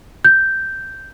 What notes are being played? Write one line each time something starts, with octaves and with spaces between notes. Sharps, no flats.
G6